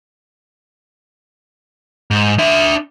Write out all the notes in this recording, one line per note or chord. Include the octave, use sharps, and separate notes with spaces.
G#2
D4 E5